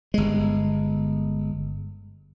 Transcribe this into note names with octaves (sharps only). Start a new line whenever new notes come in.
G1 G#3